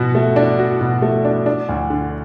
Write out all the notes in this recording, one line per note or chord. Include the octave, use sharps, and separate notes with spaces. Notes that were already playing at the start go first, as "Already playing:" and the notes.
Already playing: B2 F#4
A3
D4
F#4
B2
A3
D4
D4
D2
D3